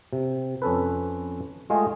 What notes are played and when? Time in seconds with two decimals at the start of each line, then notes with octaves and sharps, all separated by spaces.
0.13 C3
0.62 F2 C#4 A4 B4
1.70 G#3 A3 F4 G#4 D#5 G5